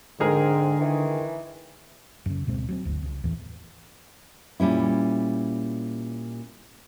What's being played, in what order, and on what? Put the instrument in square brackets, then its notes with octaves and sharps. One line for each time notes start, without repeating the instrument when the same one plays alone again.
[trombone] G#2 [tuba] D3 [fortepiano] G#3 G#4 A#4 [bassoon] C4
[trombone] D#3 [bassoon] E3
[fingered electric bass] F#2 C#3
D1 B2 G#3 C4
F#3 G#3 C4
G1 D2
C#2 C#3
E2 A2 E3
[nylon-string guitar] A#2 G3 C#4 E4